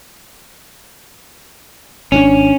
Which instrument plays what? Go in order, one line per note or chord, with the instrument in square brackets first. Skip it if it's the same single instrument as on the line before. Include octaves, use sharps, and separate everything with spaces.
[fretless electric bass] G#1 C#3 D4 [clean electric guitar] C#4